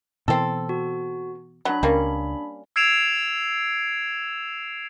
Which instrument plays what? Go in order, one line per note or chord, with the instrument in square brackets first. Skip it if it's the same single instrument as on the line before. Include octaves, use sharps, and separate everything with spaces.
[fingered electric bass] B2 E3 [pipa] C4 A4
[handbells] F#4
[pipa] F#3 [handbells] D4 B5
[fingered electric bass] C#2 [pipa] G3 A#3 C#4
[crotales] E6 G#6 C7 D7 E7 F7